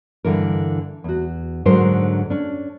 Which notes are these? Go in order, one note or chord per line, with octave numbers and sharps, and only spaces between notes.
G2 D3 E3 A#4
E2 F#4
G#2 D3 F#3 D4 A#4 C5
C#4 D4